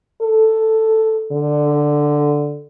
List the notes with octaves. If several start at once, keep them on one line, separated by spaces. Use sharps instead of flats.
A4
D3